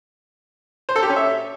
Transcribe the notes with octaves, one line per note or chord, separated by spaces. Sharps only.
C5
A4
G4
C#4
E5